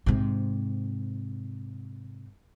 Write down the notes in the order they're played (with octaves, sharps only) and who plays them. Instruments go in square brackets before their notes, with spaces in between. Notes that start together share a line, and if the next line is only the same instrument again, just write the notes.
[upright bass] G#2 C3